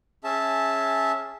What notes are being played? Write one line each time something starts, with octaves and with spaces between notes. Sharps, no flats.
C#4 G#4 E5 A5